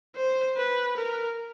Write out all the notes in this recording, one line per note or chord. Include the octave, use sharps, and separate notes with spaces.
C5
B4
A#4